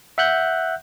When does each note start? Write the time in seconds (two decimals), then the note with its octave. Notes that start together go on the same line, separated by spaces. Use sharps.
0.18 E5 F#5 F#6 G6